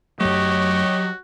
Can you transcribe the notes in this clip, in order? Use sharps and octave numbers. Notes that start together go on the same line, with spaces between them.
F#2 F#3 A3 F#4 G4 C#5 D#5